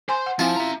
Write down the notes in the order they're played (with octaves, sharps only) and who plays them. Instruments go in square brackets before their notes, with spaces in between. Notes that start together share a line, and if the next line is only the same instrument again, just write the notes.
[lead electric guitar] C5 [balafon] G#5 C6
[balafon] F#5
[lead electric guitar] F3 [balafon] C4 G#5 [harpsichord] E4 F4
[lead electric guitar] E5 A#5